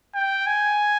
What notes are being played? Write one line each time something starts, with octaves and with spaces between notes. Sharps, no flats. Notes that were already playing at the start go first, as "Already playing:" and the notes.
G5
G#5